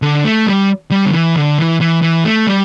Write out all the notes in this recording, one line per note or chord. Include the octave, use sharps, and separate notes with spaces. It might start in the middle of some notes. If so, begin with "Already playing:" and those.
D3
A3
G3
G3
D3
E3
D3
E3
E3
E3
A3
G3